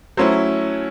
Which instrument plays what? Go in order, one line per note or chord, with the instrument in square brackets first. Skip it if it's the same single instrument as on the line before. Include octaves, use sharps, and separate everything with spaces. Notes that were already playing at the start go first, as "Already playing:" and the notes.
[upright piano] F#3 A3 C#4 E4 C5